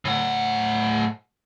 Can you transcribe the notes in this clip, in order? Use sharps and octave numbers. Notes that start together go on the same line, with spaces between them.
A2 F#5